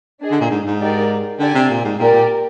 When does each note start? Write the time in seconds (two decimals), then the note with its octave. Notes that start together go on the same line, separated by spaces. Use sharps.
0.21 D4 G#4 D#5
0.31 D3
0.41 A#2
0.51 G#2
0.66 G#2
0.80 D#4 G4 A#4 D5
1.39 D3 G4 D5 G#5
1.55 C3
1.70 A#2
1.85 G#2
1.99 A#2 G4 A#4 D5
2.13 A#2